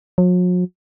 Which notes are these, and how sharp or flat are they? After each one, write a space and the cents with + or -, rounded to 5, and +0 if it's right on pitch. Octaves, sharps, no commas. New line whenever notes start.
F#3 -45